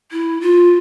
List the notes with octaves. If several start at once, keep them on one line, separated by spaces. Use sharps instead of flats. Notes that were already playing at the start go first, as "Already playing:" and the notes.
E4
F4